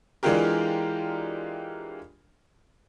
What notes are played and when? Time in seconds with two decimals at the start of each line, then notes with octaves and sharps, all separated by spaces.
0.23 E3 G#3 D4 F4 G4 A#4